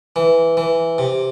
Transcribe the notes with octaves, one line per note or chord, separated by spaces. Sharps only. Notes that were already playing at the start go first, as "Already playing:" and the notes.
E3
E3
C3